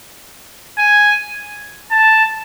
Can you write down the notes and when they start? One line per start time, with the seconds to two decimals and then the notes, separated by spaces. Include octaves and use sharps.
0.79 G#5
1.91 A5